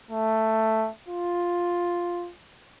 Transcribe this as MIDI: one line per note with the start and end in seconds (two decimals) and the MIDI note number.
0.11 0.89 57
1.09 2.31 65